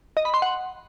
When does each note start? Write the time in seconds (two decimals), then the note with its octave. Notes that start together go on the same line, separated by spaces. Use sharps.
0.17 D#5
0.25 B5
0.34 C6
0.42 F#5